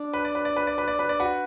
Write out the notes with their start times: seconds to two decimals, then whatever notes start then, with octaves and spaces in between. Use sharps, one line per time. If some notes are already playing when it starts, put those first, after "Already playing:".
Already playing: D4
0.13 B4
0.25 D5
0.35 B4
0.45 D5
0.56 B4
0.67 D5
0.78 B4
0.88 D5
0.99 B4
1.09 D5
1.19 F#4 B4